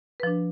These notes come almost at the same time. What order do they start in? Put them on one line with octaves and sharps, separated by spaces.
B4 F3 D4